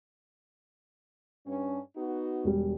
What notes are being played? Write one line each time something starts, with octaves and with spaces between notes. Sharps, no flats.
G2 C#4
B3 D#4 F#4
E1 G3